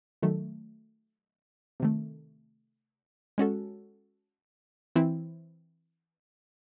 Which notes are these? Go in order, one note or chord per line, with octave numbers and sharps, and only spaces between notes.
D#3 F#3 A3
C3 D#3 A3
G#3 C#4 F#4 A4
E3 C4 E4